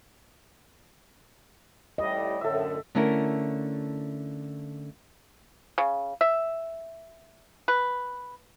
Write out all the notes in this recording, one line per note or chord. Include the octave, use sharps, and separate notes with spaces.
A1 A2 G3 D#5
F#2 A2 D3 A4 E5
D3 A3 C#4 E4 A#4
C#3
E5
B4